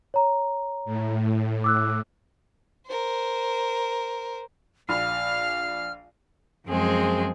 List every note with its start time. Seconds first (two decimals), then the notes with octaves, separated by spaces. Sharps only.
0.14 C#5 A#5
0.85 A2
1.64 D6 E6 F#6
2.87 A#4 C5
4.89 A#1 F5 B5 F6
6.67 F#2 F3 G#3 C4 G#4